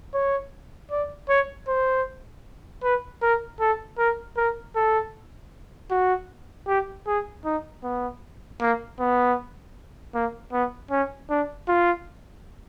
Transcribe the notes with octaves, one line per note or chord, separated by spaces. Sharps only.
C#5
D5
C#5
C5
B4
A#4
A4
A#4
A#4
A4
F#4
G4
G#4
D#4
B3
A#3
B3
A#3
B3
C#4
D4
F4